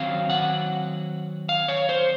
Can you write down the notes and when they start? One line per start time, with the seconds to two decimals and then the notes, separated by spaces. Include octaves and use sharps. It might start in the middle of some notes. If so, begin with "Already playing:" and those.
Already playing: D#3 F#3 C4 F5
0.30 F#5
1.49 F5
1.68 C#5
1.89 C5